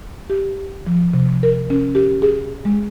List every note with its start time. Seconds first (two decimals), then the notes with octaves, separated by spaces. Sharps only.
0.30 G4
0.87 F3
1.13 C3
1.43 A#4
1.70 C#4
1.95 G4
2.22 G#4
2.65 G#3